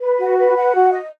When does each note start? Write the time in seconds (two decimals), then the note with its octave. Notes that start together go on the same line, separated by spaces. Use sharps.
0.01 B4
0.19 F#4
0.38 B4
0.56 F#5
0.74 F#4
0.93 D#5